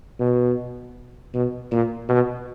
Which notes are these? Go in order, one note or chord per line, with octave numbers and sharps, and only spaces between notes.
B2
B2
A#2
B2